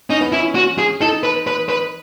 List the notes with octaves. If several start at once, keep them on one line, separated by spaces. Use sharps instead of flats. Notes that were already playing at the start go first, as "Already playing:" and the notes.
C#4 D#4
B3
C#4 E4
F#4
G#4
D#4 A4
B4
B4
B4